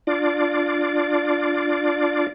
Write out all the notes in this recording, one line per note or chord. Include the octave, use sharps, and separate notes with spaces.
D4 F4 D5